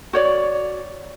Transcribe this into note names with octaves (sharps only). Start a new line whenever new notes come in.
F#4 C#5 D5